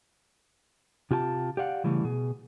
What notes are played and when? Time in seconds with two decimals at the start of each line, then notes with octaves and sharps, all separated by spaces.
1.11 C3 F4 G4 G#5 A5
1.57 G4 D5 F5 F#5
1.84 C#3 E3 G3 A3
2.04 B2 G#4